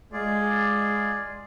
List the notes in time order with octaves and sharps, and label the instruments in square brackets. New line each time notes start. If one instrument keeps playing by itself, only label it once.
[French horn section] G#3 [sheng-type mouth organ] F4 G#4 D5